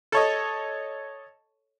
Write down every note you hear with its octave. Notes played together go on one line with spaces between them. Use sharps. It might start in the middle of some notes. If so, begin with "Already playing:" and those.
A4 C#5 D#5